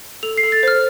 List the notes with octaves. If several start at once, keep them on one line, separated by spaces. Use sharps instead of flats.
A4 F7
C7
A4
A6
C5 F6